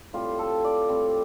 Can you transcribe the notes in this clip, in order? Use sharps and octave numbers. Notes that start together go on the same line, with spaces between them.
A2 G3 C4 F4
A4
D5
A2 G3 C4